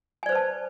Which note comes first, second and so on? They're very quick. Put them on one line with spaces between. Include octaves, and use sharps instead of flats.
G#5 D5 C5 B4 A5